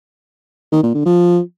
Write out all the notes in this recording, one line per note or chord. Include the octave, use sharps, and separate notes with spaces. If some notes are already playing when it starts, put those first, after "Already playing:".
D#3
A#2
D3
F3